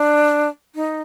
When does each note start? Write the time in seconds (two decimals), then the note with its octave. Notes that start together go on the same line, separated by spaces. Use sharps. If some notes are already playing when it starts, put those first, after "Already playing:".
Already playing: D4
0.75 D#4